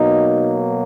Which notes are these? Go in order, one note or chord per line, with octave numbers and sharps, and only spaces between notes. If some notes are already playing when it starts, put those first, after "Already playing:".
Already playing: B2 F#3 A#3 D#4